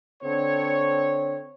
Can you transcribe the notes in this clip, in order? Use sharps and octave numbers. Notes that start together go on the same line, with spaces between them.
D3 C4 C#5